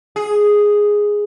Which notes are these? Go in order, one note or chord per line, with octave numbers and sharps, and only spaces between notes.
G#4